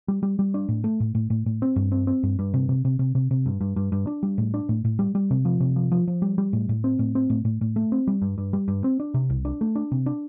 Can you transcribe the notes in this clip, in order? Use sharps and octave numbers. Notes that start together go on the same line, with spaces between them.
G3
G3
G3
D4
A2
A3
A2
A2
A2
A2
C4
G2
C4
C4
G2
G2
C3
C3
C3
C3
C3
C3
G2
G2
G2
G2
D4
G3
A2
D4
A2
A2
G3
G3
C3
F3
C3
F3
F3
F3
G3
G3
A2
A2
C4
A2
C4
A2
A2
A2
A3
C4
G3
G2
G2
G3
G2
C4
D4
C3
C2
D4
A3
D4
C3
D4